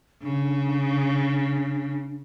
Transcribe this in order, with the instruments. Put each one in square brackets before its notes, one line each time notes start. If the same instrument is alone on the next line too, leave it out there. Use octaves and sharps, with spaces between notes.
[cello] C#3 [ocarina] D4